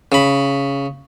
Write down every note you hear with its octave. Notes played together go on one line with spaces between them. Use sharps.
C#3 B5